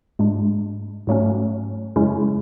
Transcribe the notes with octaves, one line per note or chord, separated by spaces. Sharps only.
G#2 G#3 D4
G#2 F#3 A3 C#4
F#2 C#3 G#3 C#4 E4